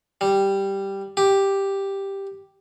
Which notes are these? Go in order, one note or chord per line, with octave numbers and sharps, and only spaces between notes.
G3
G4